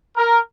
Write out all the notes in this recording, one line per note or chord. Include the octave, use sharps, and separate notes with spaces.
A#4